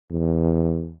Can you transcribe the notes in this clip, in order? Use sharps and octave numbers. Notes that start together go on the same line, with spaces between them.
E2